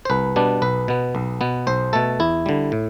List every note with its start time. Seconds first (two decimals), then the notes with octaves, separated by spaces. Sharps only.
0.05 C5
0.10 C2 B4
0.36 B2 G3 B3 D4
0.62 B1 B4
0.88 B2 B3
1.15 B1
1.41 B2 B3
1.67 B1 C5
1.93 B2 A3 A4
2.20 E2 E4
2.46 D3 G3
2.72 A2